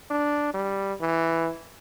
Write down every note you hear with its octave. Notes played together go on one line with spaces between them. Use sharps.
D4
G3
E3